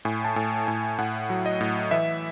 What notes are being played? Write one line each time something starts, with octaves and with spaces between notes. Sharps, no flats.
A2 G#5
A5
A2 G#5
A2 G#5
A2 F#5
F#3
D#5
A2
E3 E5